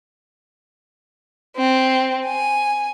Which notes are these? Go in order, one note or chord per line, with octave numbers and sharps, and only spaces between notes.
C4
G#5